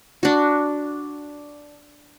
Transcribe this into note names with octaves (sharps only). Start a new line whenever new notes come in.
D4 F#4